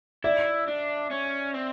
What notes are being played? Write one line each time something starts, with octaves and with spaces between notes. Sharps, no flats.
E4 D5 E5
D4
C#4
C4